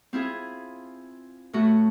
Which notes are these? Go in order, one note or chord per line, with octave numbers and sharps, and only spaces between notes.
C4 E4 F4 G#4
A2 A3 F#4